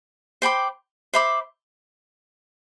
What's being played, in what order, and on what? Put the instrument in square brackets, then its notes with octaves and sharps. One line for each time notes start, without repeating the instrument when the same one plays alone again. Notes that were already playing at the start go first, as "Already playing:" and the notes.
[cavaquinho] C5 G5 B5 D6
C5 E5 B5 D6